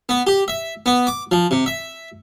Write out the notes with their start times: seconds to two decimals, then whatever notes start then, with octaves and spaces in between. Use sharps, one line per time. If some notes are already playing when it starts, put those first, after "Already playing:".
0.09 B3
0.27 G4
0.48 E5
0.86 B3
1.07 D6
1.31 F3
1.51 C3
1.66 E5